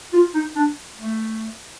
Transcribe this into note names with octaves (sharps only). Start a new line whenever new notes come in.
F4
D#4
D4
A3